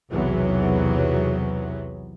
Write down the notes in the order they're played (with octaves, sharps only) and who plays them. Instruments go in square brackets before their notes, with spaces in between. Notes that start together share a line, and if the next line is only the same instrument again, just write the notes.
[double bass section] B1 E2 C3 E3 F#3 B3